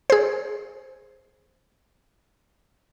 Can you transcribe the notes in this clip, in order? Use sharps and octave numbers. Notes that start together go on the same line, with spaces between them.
G#4 C5